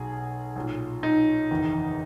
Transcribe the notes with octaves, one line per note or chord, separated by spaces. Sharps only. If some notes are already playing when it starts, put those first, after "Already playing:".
Already playing: B1 B2 G#4
B1 A#2
D#4
F#1 E2 D#3